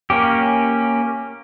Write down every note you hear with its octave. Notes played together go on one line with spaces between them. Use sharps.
A#3 C#4 G4